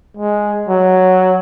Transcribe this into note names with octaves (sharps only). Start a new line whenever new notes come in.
G#3
F#3